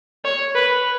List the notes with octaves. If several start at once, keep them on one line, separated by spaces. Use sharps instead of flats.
C#5
B4